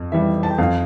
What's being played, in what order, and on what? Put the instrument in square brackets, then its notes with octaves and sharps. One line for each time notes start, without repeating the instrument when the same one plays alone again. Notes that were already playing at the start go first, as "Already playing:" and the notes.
Already playing: [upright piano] F2
E3 G3 E5
A5
G5
F2 F5